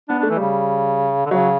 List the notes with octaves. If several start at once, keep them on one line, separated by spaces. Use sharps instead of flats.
B3 D4
A3 D4
E3
C#3 G3
D3
C#3 F#3